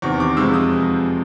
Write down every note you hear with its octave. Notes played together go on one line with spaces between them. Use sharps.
E2 C3 D#3 C#6
D6
F2 C3 F3 G#3 E6
D#6